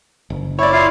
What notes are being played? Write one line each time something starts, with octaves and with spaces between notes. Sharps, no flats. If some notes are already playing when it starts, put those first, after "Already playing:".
F#1
E4 C#5 D5
E4 F4 F5